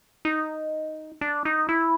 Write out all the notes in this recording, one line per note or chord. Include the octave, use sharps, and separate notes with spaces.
D#4
D4
D#4
E4